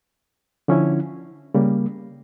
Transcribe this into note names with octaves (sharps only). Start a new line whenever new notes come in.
D3 F3 C#4 E4
C#3 G3 A#3